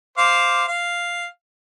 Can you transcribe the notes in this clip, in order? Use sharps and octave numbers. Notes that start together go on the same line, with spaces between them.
C5 F5 D6
F5